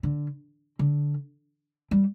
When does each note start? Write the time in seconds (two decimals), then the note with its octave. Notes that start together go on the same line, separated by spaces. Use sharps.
0.03 D3
0.79 D3
1.91 G3